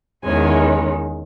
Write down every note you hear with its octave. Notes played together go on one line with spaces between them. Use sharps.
E2 D#3 G#3 C#4 G#5